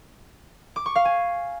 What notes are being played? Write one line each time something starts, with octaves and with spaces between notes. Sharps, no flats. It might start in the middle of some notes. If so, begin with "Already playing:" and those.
D6
C#6
F5
G#5